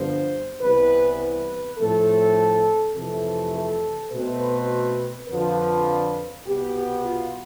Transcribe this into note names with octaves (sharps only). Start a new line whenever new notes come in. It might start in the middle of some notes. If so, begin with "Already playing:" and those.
Already playing: G2 D3 F3 B3 C5
C2 C3 E3 B3 B4
B4
A2 F3 A3 C4 A4
F2 C3 E3 A3 A4
A4
B2 A3 C4 B4
F2 D3 F3 B4
C2 B2 B3 G4
F4